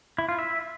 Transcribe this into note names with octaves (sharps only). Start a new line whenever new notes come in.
E4
F4
E5